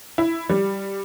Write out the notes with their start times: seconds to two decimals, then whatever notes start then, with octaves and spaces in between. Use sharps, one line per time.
0.18 E4
0.50 G3